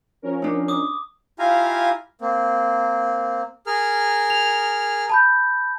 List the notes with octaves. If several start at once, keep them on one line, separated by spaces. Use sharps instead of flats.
F3 C#4 A#4
D4 D#4
D6 D#6
E4 F4 G4 F5 G#5 A#5
A#3 C4
G#4 A#4 F6
F7
A5 B5 G6